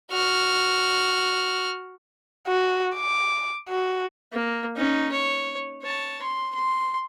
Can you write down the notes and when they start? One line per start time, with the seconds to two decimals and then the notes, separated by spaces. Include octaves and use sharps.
0.11 F#4 F6
2.48 F#4
2.95 D6
3.69 F#4
4.33 A#3
4.76 C#4 D#4
5.11 C#5
5.82 C#5 A5
6.22 C6
6.55 C6